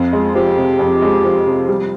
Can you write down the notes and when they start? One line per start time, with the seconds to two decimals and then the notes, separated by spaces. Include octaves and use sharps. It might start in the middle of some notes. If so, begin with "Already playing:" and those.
Already playing: F2
0.13 G#3 F4
0.35 F3 G4
0.57 C3
0.79 F2
1.02 G#3
1.24 F3
1.46 C3
1.68 G3